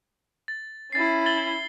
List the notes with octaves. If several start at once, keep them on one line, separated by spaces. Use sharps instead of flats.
A6
C#4 E4 A6 C7
A6 F#7 G7